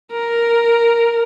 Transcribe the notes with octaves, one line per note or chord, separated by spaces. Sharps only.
A#4